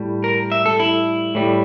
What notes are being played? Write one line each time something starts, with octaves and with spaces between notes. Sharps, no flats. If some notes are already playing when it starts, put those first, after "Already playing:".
Already playing: A2 G3
A#4
E5
A4
E4
A2 G3